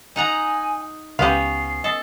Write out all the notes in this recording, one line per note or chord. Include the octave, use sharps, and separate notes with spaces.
D#4 F#5 G#5 A#5
C#2 B3 C#4 G4 F5 C7
A4 D#5